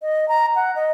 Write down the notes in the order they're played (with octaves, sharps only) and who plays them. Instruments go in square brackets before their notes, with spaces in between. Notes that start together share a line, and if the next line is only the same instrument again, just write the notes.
[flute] D#5
A#5
F#5
D#5